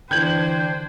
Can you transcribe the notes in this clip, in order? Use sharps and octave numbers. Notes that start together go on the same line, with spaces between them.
D3 E3 D4 C5 G5 G6 G#6 F#7